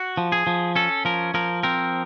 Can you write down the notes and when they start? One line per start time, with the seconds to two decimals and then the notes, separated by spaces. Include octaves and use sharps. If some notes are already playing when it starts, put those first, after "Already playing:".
Already playing: F#4
0.17 F3
0.32 G#4
0.47 F3
0.76 C#4 A4
1.05 F3 A#4
1.34 F3 A#4
1.63 C4 A#4